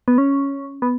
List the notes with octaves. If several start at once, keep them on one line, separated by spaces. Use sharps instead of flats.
B3
C#4
B3